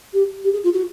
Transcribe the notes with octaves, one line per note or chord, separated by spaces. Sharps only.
G4
G4
G#4
F4
F#4